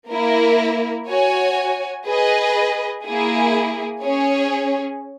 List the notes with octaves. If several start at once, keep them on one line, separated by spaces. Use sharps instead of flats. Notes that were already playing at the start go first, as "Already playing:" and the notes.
A#3 E4 A#4
F#4 C#5 G#5
G#4 B4 D#5
A#3 E4 G#4
C#4 G#4 C#5